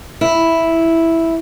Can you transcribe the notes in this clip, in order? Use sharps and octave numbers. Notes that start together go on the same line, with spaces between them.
E4